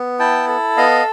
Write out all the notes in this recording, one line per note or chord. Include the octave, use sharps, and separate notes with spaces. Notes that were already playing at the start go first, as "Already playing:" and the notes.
Already playing: B3
E4 G5 A5
A4
B3 D#5 F5